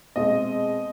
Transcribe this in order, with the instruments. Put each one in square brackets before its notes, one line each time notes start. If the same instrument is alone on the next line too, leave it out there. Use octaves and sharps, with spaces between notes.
[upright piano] B2 G#3 C4 D#5